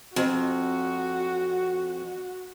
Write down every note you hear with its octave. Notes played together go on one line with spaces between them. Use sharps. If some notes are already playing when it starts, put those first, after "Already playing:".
F2 F#4